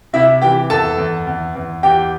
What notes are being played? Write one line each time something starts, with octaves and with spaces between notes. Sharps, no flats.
C3 E4 E5
E3 G4 G5
E2 A4 A5
E2
E2
E2
E2 G4 G5